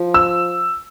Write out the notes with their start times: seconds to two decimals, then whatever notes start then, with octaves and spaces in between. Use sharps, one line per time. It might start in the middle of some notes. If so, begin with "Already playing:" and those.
Already playing: F3
0.14 E6